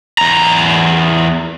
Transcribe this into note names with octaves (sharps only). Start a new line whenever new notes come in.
E2 A#5